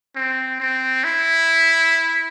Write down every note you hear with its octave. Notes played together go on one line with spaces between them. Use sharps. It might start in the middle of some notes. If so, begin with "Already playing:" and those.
C4
C4
E4